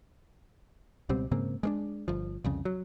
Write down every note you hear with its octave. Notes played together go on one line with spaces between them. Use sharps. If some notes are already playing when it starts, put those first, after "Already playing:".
C#2 B2 G3 C4
G#2 C#3 A#3 C4
G#3 A#3 D4
G1 F3
C2 F2 C#3
F#3